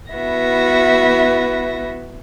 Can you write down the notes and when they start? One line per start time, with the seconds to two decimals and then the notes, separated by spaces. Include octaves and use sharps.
0.13 B3 E4 F#4 B4 E5 A#6